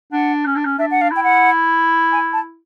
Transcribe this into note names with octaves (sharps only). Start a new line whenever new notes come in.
D4 F#5
C#4
D4
C#4
D4 E5
F#5
F5
E4 G5
F#5
G#5
A5